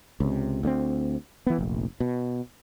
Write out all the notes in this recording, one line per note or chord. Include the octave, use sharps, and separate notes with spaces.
C#2 C3
D2 G#3 C4
E3 B3
F1 A#1
B2